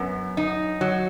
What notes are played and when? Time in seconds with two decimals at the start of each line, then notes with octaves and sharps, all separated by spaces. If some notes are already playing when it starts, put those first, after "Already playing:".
Already playing: F#2 B3
0.37 D#4
0.81 F#3